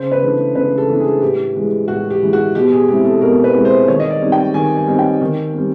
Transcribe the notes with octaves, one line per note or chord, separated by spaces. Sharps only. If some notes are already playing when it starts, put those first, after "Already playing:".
Already playing: C#3 C5
B4
E3 A3 D4
C#3 B4
A4
E3 A3 D4
G#4
A2 G4
E3 G#3
A2 F#4
G4
E3 G#3
F#4
B2 G4
G#4
G#3 C4 E4 G4
A4
B2 A#4
B4
G#3 C4 E4
C5
D#3 C#5
D#5
D5
G3 C4 D#4
G5
D#3 G#5
G#5
G3 C4 D#4
G5
D#3
G3 C4